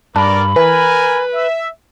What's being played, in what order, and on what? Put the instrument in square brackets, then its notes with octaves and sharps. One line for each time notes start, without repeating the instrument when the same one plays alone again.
[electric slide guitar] G2 [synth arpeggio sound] D4 [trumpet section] A#4 D5 [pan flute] B5
[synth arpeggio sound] E3 [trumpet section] A#4 G#5 [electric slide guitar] B4
[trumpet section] E5